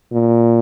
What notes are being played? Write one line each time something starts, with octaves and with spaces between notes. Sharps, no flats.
A#2